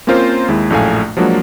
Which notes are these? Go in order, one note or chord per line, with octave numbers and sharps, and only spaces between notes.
A#3 C4 C#4 F4 A#4 C5
D#2 G#3 E4
A#1 F#2 A2 A3 F5 G#5
F3 F#3 G#3 A#3 D4 F#4